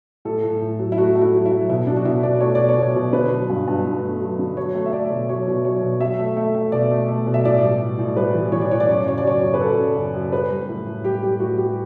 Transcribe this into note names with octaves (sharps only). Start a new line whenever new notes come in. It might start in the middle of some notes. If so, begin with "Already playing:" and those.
A2 A4
A2
A2
F#3
E4
A3 F#4
A3 F#4
E4
F#3
E4
F#3
B2 E4
F#3 D4
F#4
B2 E4
B2 D5
A3 C#5
B2 D5
C#5
B2
B2
D3 B4
F#3
G2
G2
G2
A3
F#3
D3
F#3 C#5
A3
E5
A3 D5
B2
F#3 C#5
B2
F#3 C#5
B2
F#3 E5
A3
A3
A3
B2 D5
A3
A3
B2
E5
A2 D5
G3
A2
A2
G3 B4
E3
E3 C#5
D5
A2 C#5
D5
F#2 C#5
D5
C#3 C#5
D5
F#3 C#5
F#2
B4
F#2 A4
C#3
F#2
F#2
G3 B4
G3
A2
A2
G3 G4
G3 G4
A2 F#4
G3 G4